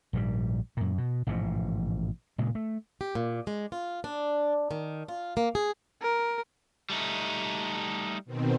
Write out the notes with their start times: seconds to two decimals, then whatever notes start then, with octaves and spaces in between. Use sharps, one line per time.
0.13 A#1 G#2 B2 G3
0.77 F#2 A#2
0.98 B2
1.27 A1 G#2 B2 F3
2.38 A#2 C#3 G#3
2.55 A3
3.01 G4
3.15 A#2
3.47 G#3
3.72 F4
4.04 D4
4.71 D#3
5.08 F4
5.37 A#3
5.55 G#4
6.02 A#4
6.90 G3 A3 D#4
8.25 B2 D#3 C4